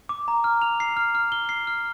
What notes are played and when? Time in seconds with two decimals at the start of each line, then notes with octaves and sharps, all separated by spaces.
0.09 D6
0.28 A#5
0.44 F6
0.62 F7
0.80 C7
0.97 F6
1.15 F6
1.32 G7
1.49 C7
1.67 F6